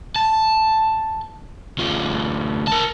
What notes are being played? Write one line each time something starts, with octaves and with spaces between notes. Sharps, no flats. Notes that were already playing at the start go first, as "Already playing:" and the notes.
A5
D2 F4
A#4 A5